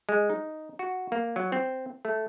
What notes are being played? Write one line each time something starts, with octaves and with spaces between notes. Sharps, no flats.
G#3
D#4
F#4
A#3
F#3
C4
A3